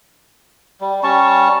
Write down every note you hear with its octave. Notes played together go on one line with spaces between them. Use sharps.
G3
G3 C#4 A5 C#6